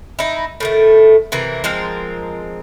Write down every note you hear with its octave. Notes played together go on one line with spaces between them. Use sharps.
D#4 E4
A2 D#3 A3
C3 E3 A#3
F3 G#3 C4 A#4